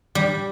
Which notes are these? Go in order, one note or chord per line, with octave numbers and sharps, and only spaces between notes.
G3